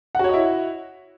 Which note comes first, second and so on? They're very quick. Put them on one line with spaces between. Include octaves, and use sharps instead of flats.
F#5 F#4 C#5 D#5 E4